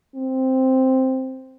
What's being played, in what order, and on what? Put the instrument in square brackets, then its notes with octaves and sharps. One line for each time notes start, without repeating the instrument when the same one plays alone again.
[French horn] C4